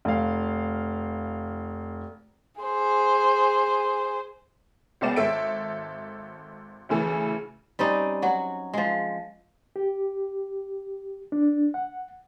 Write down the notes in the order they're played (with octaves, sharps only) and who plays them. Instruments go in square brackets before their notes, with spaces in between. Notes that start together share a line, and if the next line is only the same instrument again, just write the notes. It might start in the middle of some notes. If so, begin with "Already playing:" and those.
[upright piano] F1 F5
[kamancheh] G#4 C5
[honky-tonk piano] C#2 C#3 B3 D5 E7
G#1 A4 C#5 E5 D7
D2 C#3 E3 A4
[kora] G3 C4 C#4 D#4
F#3 F#4
F3 G#3
[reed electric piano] G4
D4
F#5